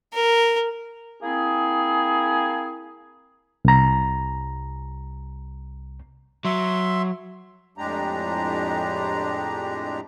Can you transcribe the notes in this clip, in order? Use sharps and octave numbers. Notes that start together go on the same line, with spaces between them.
A#4
A#3 C4 E4 G#4
C2 A#5
F#3 E5 C6
F2 A2 G#3 D4 G4 A#5